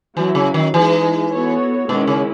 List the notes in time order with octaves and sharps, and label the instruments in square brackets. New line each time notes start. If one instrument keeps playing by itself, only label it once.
[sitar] E3 [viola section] F#3 C#4 E4
[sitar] C#3
D#3
[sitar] E3 [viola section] G#3 D#4 G#4
[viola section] B3 F#4 A4 C#5
[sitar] B2 [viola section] D#3 G#3 C#4 E4
[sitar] C#3